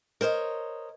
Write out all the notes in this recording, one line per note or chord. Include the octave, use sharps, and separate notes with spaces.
A#4 C5 C#5 D#5